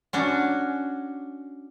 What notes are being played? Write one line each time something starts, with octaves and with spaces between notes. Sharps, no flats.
C#4 D4 F#4